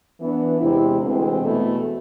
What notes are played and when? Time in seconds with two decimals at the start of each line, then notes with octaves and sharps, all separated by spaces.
0.20 E3 B3 D4
0.59 E2 C3 G#3 C4 E4
1.00 D2 C3 E3 G#3 C4
1.40 E2 B2 A3 E4